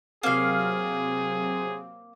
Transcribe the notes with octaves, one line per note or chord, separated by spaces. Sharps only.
C3 F#3 A#3 C4 G#4 F5